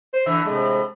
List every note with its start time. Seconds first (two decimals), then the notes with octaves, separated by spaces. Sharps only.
0.13 C5
0.26 D3 E3 E5
0.45 A2 C3 G#3